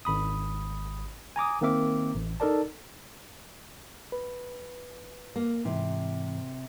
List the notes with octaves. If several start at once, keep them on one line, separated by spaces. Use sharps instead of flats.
G#1 B5 D#6
G#5 A#5 D6 D#6
D#3 A#3 C4 A#4 E5 D6
A1
D#4 A4 A#4 D5 A5
B4
A#3
G#2 C3 E3